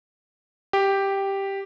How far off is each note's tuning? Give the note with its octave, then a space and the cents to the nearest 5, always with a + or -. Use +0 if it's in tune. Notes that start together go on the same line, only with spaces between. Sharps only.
G4 +0